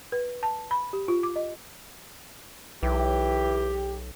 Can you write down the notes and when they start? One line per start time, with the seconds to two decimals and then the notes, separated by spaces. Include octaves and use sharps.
0.12 B4
0.43 A5
0.71 B5
0.93 G4
1.08 F4
1.23 D6
1.36 D#5
2.83 B1 E3 G4